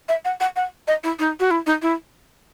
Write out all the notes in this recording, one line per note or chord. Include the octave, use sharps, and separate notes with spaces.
E5
F#5
F#5
F#5
D#5
E4
D#4
F#4
E4
D#4
E4